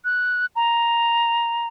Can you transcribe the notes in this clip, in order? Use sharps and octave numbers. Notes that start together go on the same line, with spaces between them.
F#6
A#5